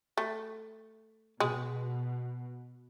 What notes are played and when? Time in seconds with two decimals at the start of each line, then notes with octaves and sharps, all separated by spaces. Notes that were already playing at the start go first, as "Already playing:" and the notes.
0.18 A3
1.40 B2 G#3